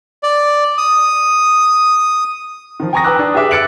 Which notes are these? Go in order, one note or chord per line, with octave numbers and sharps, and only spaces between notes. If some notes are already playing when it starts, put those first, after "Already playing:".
D5
D#6
D#3 F3
G5 G#5 A#5 C#6 D#6 A#6
B4 G5 A#5 D6 E6 F#6
D4 D#6
G4 G#4 B4 E5 D6 F#6
E6 F#6 A6 C#7 D7 F#7